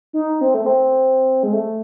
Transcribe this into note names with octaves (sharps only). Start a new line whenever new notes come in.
D#4
C4
A3
C4
G#3
A3